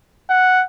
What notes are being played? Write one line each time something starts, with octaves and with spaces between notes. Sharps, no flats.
F#5